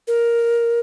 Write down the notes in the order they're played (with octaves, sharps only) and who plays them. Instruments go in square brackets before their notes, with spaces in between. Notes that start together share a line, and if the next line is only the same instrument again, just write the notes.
[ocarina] A#4